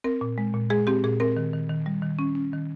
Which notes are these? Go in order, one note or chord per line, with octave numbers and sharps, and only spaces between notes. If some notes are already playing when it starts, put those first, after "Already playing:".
C4 A#4
A#2
G#3
A#2
G#3 G#4
C4 G4
A#2 G#4
C4 A#4
D#3
D#3
D#3
G3
D#3
C#4
C#4
D#3